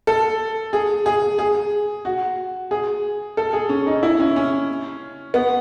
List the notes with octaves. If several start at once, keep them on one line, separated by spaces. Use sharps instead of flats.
A4
G#4
G#4
G#4
F#4
G#4
A4
G#4
C#4
D#4
E4
C#4
C#4
B3